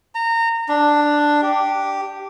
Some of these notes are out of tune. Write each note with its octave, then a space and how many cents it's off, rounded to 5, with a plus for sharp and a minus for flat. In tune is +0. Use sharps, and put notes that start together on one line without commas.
A#5 -25
D4 +5
G4 -5